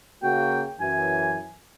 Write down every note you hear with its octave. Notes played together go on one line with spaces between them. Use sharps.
C#3 A#3 F#4 G5
F#2 E3 G#5